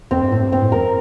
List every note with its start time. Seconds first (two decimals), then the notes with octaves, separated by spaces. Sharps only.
0.11 F2 C4
0.21 G2
0.31 A2 C4
0.41 G2
0.52 G2 C4
0.62 A2
0.72 F2 A#4